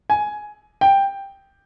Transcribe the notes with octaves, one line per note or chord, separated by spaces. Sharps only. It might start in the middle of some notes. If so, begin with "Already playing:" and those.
G#5
G5